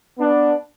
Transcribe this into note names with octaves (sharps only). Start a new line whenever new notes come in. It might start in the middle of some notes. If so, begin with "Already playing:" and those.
B3 D4